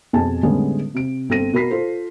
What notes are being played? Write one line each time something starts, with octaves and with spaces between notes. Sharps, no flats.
F2 B2 G#4 G#5 A5
A2 D3 G3 G#3 B3 C#4
C3 D7
G1 C4 A4 A#6 D#7
B2 F#4 A#4 B5 B6 C7
F4 A4 C5